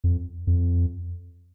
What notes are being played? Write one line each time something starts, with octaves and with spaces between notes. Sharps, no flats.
F2
F2